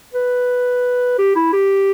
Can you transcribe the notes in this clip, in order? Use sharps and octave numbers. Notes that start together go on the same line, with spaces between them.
B4
G4
E4
G4